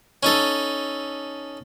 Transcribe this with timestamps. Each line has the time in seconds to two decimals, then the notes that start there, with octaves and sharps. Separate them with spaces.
0.23 C#4 D#4 A4